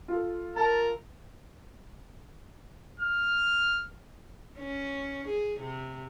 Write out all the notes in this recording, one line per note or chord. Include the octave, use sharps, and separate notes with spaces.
F4 A4
A#4 A5 A#5 A6
F6
C#4
G#4
C3